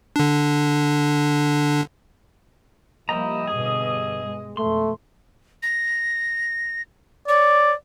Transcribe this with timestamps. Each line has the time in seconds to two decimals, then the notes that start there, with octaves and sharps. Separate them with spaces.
0.16 D3 D4
3.09 F3 G3 A#3 E4 G4 D#5 A#5
3.47 G2 B2 D3 G#4
4.22 G#3
4.57 F2 B2 A3 C6
5.63 A#6
7.28 C#5 D5